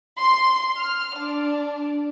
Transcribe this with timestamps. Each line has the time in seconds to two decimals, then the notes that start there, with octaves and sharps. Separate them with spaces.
0.20 C6
0.77 F6
1.16 D4